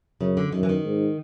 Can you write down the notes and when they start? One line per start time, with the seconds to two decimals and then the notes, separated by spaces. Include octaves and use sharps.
0.21 F#2 C#3
0.37 D3
0.52 F#2 D#3
0.63 E3
0.69 D#3
0.84 G#2